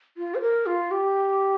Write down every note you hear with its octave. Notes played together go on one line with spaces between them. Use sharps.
F4
C5
A#4
F4
G4